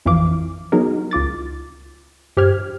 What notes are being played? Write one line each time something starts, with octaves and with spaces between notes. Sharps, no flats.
A1 F2 E3 F3 F5 D6
F#3 B3 D#4 F#4 G#4 A#4
C#2 F4 D6 A6
G2 G4 C5 F6 G#6